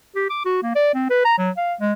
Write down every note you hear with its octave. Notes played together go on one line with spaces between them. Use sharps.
G4
D6
F#4
A#3
D5
C4
B4
A#5
F#3
F5
G#3